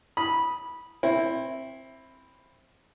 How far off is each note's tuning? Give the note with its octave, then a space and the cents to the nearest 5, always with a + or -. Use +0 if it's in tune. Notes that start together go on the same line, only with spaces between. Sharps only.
B5 -15 D#6 +0
C4 +15 E4 +0